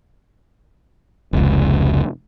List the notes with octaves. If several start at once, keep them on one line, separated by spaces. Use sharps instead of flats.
F1 C#2